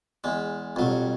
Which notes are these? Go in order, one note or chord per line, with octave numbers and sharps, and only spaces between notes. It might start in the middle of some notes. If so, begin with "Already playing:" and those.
E2 G#3
F2 B2 F#3 G3